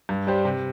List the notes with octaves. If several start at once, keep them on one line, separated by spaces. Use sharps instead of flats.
G2
G3 D4 G4 C5
C3